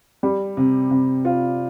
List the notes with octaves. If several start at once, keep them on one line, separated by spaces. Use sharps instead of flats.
G3
C3
C3
F4